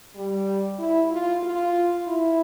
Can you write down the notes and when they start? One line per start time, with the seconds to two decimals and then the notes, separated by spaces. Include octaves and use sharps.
0.16 G3
0.79 E4
1.11 F4
1.43 F4
2.07 E4